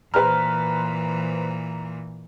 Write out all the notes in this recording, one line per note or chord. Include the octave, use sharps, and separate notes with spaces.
A#2 E3 B4 C5 A#5 F6